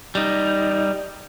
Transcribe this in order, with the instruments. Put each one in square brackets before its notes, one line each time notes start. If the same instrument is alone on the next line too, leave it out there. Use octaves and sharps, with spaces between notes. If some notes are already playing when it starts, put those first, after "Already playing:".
[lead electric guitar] G3 D#4